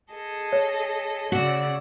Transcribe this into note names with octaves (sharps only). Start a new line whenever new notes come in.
G#4 A4 D#5
C#5
C#3 F#4 D5 E6